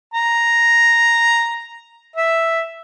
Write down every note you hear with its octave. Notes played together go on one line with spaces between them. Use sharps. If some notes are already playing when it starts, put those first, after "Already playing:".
A#5
E5